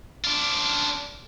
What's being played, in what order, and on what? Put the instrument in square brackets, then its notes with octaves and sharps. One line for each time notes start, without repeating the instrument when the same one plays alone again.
[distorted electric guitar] D4 F4